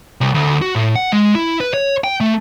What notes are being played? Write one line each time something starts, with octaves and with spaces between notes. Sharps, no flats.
C2
D2
F#4
A2
F#5
G#3
E4
B4
C#5
G5
A3